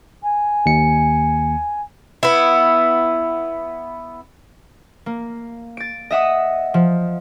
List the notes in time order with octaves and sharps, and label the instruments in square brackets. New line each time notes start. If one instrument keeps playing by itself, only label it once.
[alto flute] G#5
[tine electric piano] D#2 C#7
[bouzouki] B3 E4
[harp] A#3
A6 D7
D#5 E5 F#5 D#6
F3